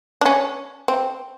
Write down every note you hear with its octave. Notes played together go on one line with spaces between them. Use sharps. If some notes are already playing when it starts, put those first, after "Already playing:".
D4
C#4
C4